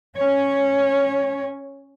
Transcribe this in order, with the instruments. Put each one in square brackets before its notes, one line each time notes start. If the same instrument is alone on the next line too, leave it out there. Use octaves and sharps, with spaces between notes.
[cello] C#4 C#5